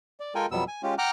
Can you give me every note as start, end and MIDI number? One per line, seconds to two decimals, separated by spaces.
0.20 0.34 74
0.35 0.46 56
0.35 0.46 65
0.35 0.46 69
0.35 0.46 70
0.35 0.46 79
0.35 0.46 80
0.51 0.64 41
0.51 0.64 47
0.51 0.64 54
0.51 0.64 55
0.51 0.64 59
0.51 0.64 88
0.68 0.82 80
0.83 0.95 56
0.83 0.95 61
0.83 0.95 65
0.83 0.95 67
0.98 1.11 78
0.98 1.11 79
0.98 1.11 82
0.98 1.11 86
0.98 1.11 89
0.98 1.11 90